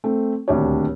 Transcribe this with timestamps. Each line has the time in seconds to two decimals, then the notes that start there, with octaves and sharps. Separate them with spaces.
0.04 A3 C4
0.48 D#1 D2 C4 D4 G4 C#5